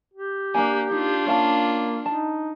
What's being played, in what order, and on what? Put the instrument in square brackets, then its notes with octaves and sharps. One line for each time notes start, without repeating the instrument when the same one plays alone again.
[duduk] G4
[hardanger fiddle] A#3 [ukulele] D4 G#5
[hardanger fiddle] D4 F4 [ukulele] D#4
[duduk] A#3 [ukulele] C#4 F5 A5
[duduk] D#4 [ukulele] A5